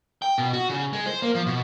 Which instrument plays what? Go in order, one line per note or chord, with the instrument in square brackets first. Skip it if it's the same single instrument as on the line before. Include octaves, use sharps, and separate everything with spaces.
[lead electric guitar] G5
B2
F#4
C#3
G#3
C5
A#3
F3
B2